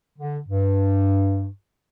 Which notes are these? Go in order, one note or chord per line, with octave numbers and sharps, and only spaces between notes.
D3
G2